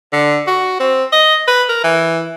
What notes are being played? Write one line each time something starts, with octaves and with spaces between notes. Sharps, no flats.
D3
F#4
C4
D#5
B4
A#4
E3